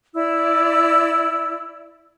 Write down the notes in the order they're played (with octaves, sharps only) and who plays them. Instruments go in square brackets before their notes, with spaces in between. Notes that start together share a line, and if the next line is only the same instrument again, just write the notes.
[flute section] E4 D5 E6